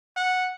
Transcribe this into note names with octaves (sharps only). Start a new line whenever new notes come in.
F#5